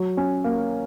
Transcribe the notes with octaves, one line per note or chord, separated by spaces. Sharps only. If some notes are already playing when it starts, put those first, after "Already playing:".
Already playing: F#3
C#4
A#3